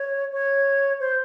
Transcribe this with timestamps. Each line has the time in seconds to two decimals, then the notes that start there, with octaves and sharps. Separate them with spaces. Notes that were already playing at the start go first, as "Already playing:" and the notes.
Already playing: C#5
0.32 C#5
1.00 C5